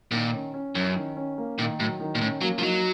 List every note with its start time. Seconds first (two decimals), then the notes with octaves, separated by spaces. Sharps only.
0.11 A#2 D#3
0.33 C#4
0.54 C#4
0.75 F#2 C#4
0.95 D#3
1.17 C#4
1.38 A#3
1.58 A#2 D#3
1.79 A2 F#3
2.00 D#3
2.15 A#2
2.21 A2 C#4
2.41 F#3 A#3
2.58 F3
2.63 F#3 D#4